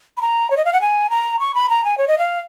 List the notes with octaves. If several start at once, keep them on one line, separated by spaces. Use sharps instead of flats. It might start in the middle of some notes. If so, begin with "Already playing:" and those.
B5
A#5
C#5
D#5
F5
F#5
G#5
A#5
C#6
B5
A#5
G#5
C#5
D#5
F5